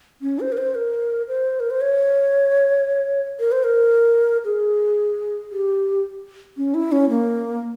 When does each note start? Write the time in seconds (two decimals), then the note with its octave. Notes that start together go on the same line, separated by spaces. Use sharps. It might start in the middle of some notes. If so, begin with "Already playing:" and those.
0.22 C#4
0.40 C5
0.52 A#4
0.58 C5
0.75 A#4
1.28 C5
1.60 A#4
1.70 C5
1.81 C#5
3.40 A#4
3.52 C5
3.64 A#4
4.45 G#4
5.51 G4
6.57 C#4
6.74 E4
6.92 C#4
7.10 A#3